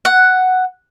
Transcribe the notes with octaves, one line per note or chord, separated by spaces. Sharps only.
F#5